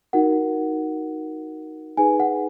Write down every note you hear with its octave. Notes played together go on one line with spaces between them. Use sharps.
D#4 F#4 A#4 F#5
D#4 G#4 B4 G#5
F#5